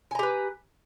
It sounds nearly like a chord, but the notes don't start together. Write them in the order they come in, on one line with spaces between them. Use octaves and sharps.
G#5 A#5 G4 B4